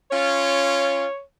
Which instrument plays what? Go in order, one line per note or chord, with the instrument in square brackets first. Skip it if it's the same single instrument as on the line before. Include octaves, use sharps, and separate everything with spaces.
[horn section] C#4 F4 [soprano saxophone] C#5